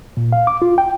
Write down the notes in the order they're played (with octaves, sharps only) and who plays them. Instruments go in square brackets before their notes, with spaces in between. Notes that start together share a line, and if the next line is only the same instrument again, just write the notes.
[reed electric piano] A#2
F5
D6
F4
G5